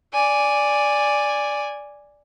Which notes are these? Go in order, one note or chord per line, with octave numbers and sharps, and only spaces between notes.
D5 G#5